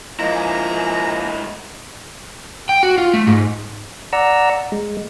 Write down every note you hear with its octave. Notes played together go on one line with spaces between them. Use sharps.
F3 G#3 A#3 E4 D#5 A#5
G#5
G5
F#4
F4
A3
G#2
D5 F#5 A#5 E6
G#3